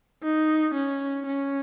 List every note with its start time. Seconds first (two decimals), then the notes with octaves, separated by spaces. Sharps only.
0.23 D#4
0.74 C#4
1.26 C#4